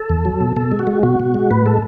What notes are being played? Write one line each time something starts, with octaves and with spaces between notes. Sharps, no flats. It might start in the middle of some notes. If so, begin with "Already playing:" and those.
Already playing: A4
E2
F#3
B2
B2 A4
G#3
F#4
G#3
B2 F#4
B2
G#3
A2 B4
G#3 A4